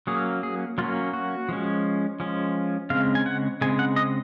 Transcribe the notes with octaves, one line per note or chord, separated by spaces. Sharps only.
F#3 A#3 C#4 G#4
G#4
F#3 A#3 C#4 F4
F#4
F3 G#3 C#4
F3 G#3 C#4
C#3 G#3 C4 F5
G#5
F#5
C#3 G#3 C4 G#5
F#5
D#5